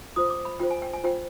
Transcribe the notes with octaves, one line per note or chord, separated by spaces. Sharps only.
F4 C5 D#6
D6
B5
F4 C5 G5
G#5
G5
G#5
F4 C5 G5